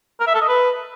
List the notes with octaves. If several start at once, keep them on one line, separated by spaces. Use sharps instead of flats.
A#4
E5
A4
D#5
B4